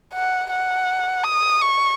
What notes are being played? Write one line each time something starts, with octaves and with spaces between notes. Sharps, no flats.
F#5
F#5
D#6
C#6